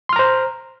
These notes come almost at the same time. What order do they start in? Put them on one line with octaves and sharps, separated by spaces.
C6 F6 A#5 C5